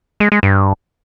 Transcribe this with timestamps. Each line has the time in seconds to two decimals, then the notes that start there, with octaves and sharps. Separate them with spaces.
0.20 G#3
0.32 G#3
0.43 G2